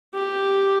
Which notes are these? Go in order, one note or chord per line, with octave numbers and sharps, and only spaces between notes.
G4